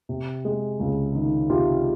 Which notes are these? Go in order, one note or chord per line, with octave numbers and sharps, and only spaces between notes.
C3
G#3
C#2
D#3
C3 F4 G4